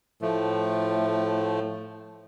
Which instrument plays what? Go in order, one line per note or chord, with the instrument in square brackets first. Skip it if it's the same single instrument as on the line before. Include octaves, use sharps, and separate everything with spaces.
[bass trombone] A2 [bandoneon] F3 A3